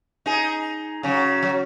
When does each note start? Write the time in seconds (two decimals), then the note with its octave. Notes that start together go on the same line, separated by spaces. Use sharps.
0.26 D#4 G#4
1.03 C#3 F#3
1.43 F#3